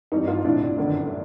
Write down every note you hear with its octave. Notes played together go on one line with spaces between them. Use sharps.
G#1 G2 E3 D#4
D#4 F4
B1 A2 E3 D4 E4
G1 F#2 D3